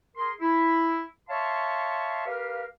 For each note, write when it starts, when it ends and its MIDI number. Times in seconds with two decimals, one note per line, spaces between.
0.17 0.32 68
0.17 0.32 70
0.17 0.32 84
0.42 1.02 64
1.30 2.24 73
1.30 2.24 76
1.30 2.24 77
1.30 2.24 81
1.30 2.24 84
1.30 2.24 85
2.26 2.64 67
2.26 2.64 70
2.26 2.64 71
2.26 2.64 77